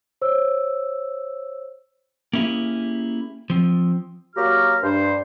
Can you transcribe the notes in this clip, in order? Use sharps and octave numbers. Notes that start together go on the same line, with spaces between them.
C5 C#5 E6
A#3 C#4 E4 G4 G#4
F3 C4
F#3 A#3 F#4 G4 A#5 F6
G2 D4 C5